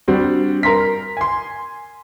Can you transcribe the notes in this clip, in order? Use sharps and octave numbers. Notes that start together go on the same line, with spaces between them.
G3 C4 D4 F#4
A#4 A#5 C6 B6
G#5 C6